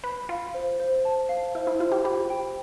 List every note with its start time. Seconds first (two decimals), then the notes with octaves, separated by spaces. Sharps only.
0.04 B4 B5
0.29 F4 F5
0.54 C5
0.80 C5
1.05 A5
1.29 F5
1.55 E4 C5
1.67 E4
1.79 F4 C5
1.92 G4
2.04 G4 B5
2.30 G5